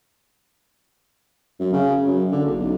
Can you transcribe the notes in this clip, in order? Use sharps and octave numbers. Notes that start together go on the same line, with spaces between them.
F#2
C#3
F#2
D3
F#1
B1